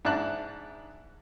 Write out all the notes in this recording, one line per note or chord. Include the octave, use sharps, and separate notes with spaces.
G#2 D4 E4 A5 F#6